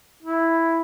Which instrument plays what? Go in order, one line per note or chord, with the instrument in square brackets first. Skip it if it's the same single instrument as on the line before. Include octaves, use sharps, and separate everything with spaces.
[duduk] E4